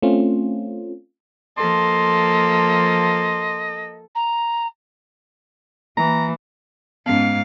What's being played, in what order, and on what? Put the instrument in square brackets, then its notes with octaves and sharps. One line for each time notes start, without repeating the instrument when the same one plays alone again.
[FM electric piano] A3 C4 C#4 F4
[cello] F3 A#3 [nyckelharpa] A4 [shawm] D#5 [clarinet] C6
[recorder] A#5
[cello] E3 A#3 [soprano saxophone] A#5
[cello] G#2 F5 [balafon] B3 C#4